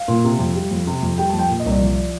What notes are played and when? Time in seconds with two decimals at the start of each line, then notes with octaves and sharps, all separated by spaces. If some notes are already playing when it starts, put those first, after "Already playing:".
Already playing: F5
0.08 A#2
0.25 C3
0.39 F2
0.56 G3
0.71 F2
0.87 C3
1.03 F2
1.18 G3 G5
1.29 A5
1.33 F2
1.39 G5
1.49 A#2
1.60 D#5
1.66 C2
1.71 D5
1.81 F3